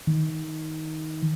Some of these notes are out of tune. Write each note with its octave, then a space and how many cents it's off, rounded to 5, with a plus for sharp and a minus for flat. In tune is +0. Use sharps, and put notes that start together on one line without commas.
D#3 +15